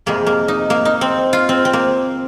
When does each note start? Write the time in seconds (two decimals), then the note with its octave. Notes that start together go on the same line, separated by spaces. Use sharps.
0.06 F2 C3 G#3 A#3
0.26 A#3
0.48 D#4
0.70 A#3
0.85 D#4
1.01 C4
1.33 F4
1.49 C4
1.65 C4
1.73 A#3